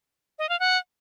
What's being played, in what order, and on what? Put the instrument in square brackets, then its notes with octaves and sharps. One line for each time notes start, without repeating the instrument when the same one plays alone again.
[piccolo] D#5
F5
F#5